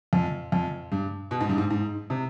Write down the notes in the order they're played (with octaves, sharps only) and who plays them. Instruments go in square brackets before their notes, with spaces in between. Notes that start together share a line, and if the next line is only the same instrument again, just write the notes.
[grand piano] F2
F2
G2
B2
G#2
G2
G#2
G#2
C3